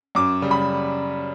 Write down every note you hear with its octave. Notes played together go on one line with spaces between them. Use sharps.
F#2 D6
C#3 G3
B5